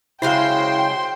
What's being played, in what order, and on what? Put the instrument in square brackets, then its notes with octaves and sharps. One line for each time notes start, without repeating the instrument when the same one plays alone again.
[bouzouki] C#3 F#3 G#3 [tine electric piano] E4 F5 [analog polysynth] C5 C6 [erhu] G5